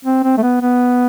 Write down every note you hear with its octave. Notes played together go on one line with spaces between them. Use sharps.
C4
C4
A3
B3
B3